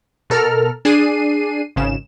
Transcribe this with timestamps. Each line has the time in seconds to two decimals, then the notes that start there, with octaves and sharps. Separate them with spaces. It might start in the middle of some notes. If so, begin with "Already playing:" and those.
0.30 B2 A4 A#4 F6
0.85 D4 G#4 C7 D#7
1.76 G#1 C#3 E7